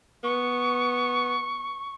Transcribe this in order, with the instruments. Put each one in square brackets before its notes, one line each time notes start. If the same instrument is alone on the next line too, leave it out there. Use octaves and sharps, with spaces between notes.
[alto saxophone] B3 [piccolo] C#6